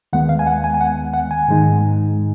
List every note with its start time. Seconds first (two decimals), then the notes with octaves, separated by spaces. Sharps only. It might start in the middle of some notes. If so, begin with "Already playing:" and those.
0.13 D#2 D#3 G#3 B3 F#5
0.29 F5
0.39 G#5
0.47 F#5
0.64 G#5
0.74 G#5
0.81 F#5
1.14 F#5
1.31 G#5
1.48 G#2 D#3 G#3 D#4